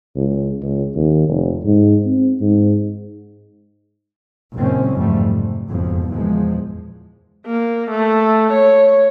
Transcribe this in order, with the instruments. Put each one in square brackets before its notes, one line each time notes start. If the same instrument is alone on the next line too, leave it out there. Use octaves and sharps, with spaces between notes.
[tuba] C#2
C#2
D#2
F1
G#2
C4
G#2
[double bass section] F#1 F#2 A#2 G#3 C4 C#4
F2 G#2 F3 G3 A3
C3
F#1 F2 G#2 B2 F3
F#1 E2 A#2 F3 G#3
[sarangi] A#3
A3
C#5